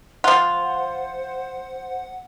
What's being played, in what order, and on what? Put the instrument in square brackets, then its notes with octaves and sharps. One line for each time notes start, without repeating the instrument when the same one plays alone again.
[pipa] F3 F4 [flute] C5 [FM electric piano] F#5